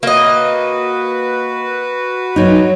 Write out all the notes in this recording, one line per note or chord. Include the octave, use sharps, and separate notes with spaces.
A#3 F#4 B4 D#5
F#3 D#4